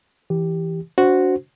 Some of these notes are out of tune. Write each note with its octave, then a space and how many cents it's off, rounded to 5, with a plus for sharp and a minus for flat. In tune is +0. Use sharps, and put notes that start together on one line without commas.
E3 +0 G4 +0
D4 -30 F#4 +0 C5 +0